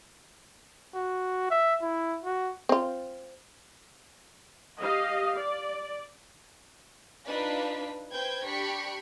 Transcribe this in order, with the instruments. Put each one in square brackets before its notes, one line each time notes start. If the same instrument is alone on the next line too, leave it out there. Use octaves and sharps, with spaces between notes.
[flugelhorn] F#4
E5
E4
F#4
[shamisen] C4 F4
[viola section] G4 D#5 F5
D5
[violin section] D4 D#4 F4 B4 B6
B4 C5 G5 G6 G#6
D4 G4 B5 C#6 B6 C#7